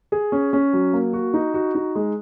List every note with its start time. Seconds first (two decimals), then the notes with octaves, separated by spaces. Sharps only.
0.12 G#4
0.32 C#4
0.53 C#4
0.73 F#3
0.93 A#3
1.13 F#4
1.34 D#4
1.54 F#4
1.75 D#4
1.95 G#3